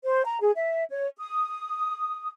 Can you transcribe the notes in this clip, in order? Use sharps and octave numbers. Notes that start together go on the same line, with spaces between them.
C5
A#5
G#4
E5
C#5
D#6